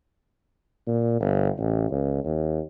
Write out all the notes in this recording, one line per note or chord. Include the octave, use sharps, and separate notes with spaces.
A#2
G1
A1
C#2
D#2